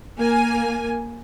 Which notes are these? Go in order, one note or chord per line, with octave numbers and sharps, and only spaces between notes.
A#3 G#5